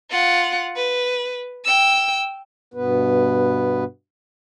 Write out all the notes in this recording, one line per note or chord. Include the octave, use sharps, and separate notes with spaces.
F4 F#5
B4
G5 E6
G2 B2 B3 B4